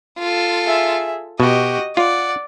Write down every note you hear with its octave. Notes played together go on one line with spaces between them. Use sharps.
F4 A4
G#4 E5
B2 F#4 G4 D#5
F4 D5 F#5